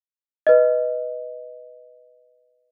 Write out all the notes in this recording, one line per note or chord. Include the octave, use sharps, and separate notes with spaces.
B4 D#5